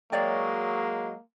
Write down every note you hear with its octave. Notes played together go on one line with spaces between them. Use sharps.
F#3 G#3 A#3 C#5 D5 G5